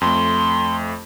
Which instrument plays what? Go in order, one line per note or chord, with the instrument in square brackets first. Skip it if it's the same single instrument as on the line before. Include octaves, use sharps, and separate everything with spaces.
[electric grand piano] F2 A3 [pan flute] C6